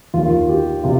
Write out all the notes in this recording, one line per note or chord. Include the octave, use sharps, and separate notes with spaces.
D#2 F4
D#3
G4
C3 F4